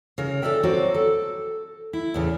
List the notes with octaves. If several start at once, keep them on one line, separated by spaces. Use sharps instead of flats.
C#3 A#4
A4 C5 D5 E5 G5
F#3 C4 F#4 D5
A4
E4
E2 A2 C#3